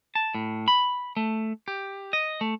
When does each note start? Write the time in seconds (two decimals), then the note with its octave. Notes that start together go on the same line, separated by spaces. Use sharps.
0.15 A5
0.35 A2
0.68 B5
1.17 A3
1.68 G4
2.13 D#5
2.41 A3